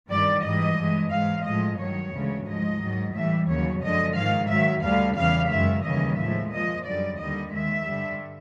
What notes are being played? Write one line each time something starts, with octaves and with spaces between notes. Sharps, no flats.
G2 D#3 G3 D5
G#2 E3 G3 D#5
G2 E3 G#3
G#2 E3 G#3 F5
A2 F3 G#3 D#5
G2 D#3 F#3 C#5
D2 C#3 E3 G#3
G#2 F3 G#3 D#5
G#2 D#3 F#3
A2 E3 G3 E5
D#2 C#3 F#3 C#5
F#2 D3 F3 G#3 D#5
G#2 D#3 G#3 F5
G#2 D#3 F#3 E5
D2 D3 G3 F5
E2 C#3 E3 G3 F5
F#2 D#3 G#3 E5
D#2 C#3 E3 G3 D#5
A2 F3 G#3 E5
A#2 F3 G#3 D#5
F#2 D3 G3 D5
D#2 D3 G3 D#5
D#2 D#3 G#3 E5
G2 D3 G3